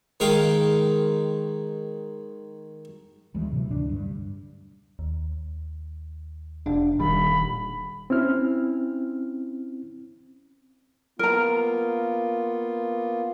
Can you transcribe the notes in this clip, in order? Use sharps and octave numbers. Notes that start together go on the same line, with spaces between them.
D#3 G#3 F5 G5
D2 E3 G#3 A3
A2 C3 E3 F#3
D2 D4
G2
D#2
F1 D4
E1 A#2 D#3 G3 B5
C4 C#4 E4 F6
A#3 B3 F4 A#4 A#5